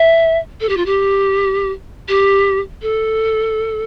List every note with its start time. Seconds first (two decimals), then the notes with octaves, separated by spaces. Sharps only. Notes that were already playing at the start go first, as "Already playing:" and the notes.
Already playing: E5
0.60 A4
0.69 G4
0.77 F4
0.86 G4
2.08 G4
2.82 A4